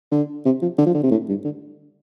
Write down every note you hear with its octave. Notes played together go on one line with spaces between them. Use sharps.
D3
C3
F3
D3
F3
D3
C3
A2
G2
D3